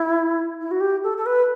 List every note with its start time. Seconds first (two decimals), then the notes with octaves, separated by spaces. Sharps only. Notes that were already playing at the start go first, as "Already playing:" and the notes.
Already playing: E4
0.61 E4
0.71 F#4
0.80 G4
1.03 A4
1.17 A4
1.26 B4